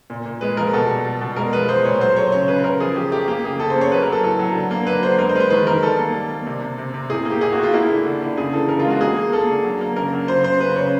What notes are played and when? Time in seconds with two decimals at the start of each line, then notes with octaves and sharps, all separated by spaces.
0.10 A#2
0.26 A#2
0.41 G#3 B4
0.57 F3 A#4
0.73 B2 A4
0.90 G3
1.05 G3
1.21 B2
1.36 G#3 A#4
1.53 F3 B4
1.69 G#3 C5
1.85 A#2 C#5
2.01 F#3 C5
2.16 A3 C#5
2.32 C#3 C#5
2.48 C#3 B4
2.64 C#3 A#4
2.80 F3 G#4
2.96 F3 G4
3.11 A3 G4
3.28 A#3 G4
3.44 C#3 G#4
3.60 C#3 A4
3.70 C5
3.76 A#3
3.81 C#5
3.91 F#3 B4
4.02 A#4
4.07 F#3
4.12 A4
4.24 A2 A4
4.39 F#3
4.55 D3
4.71 A#3
4.87 F#3 B4
5.03 D3 C5
5.19 G#3 A#4
5.29 C5
5.35 G#3 B4
5.40 C5
5.50 D#3 B4
5.67 D#3 A#4
5.83 G3 A4
5.98 A#3
6.14 G3
6.30 A#3
6.47 C3
6.62 C3
6.78 C3
6.94 C3
7.10 A2 G#4
7.25 A#3
7.31 G4
7.41 A2 G#4
7.52 F#4
7.58 A2 F4
7.73 A#3 E4
7.90 D3
8.06 D3
8.22 D3
8.37 C#3 G#4
8.53 E3 A4
8.69 C#3 A#4
8.79 F4
8.85 G#3
8.90 F#4
9.01 A#3 G#4
9.17 A#3
9.33 A#3 A4
9.49 D3
9.64 F#3
9.81 A#3
9.96 C#3 A#4
10.13 F#3
10.28 C#3 C5
10.44 C#3 C5
10.60 C#3 B4
10.76 C#3 C#5